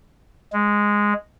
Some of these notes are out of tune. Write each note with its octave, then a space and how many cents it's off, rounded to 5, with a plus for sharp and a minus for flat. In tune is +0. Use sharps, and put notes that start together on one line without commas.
G#3 -5